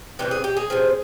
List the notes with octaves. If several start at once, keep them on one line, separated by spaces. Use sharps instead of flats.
C3 E3 G3 C4 G4
G#4
G4
G#4
C3 F3 C4